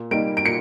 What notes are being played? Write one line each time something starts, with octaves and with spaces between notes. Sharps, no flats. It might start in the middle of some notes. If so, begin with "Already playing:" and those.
Already playing: A#2
G3 A#3 D#4 D7
D7
A#2 C#7